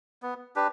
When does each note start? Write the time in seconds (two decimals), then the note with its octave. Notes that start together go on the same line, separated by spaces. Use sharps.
0.22 B3
0.56 D4 G4 B4